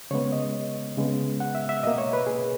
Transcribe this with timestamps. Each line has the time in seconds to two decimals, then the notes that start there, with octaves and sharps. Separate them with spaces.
0.11 C#3 G#3 B3 C#5
0.32 D#5
0.97 C#3 G#3 B3
1.40 F#5
1.55 E5
1.69 E5
1.83 B2 A#3 D#5
1.98 C#5
2.13 B4
2.27 G#4